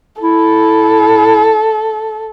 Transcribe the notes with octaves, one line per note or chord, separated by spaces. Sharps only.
E4 A4